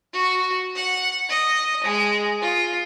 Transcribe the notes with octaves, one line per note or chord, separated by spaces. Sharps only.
F#4
F#5
D#5
G#3
F4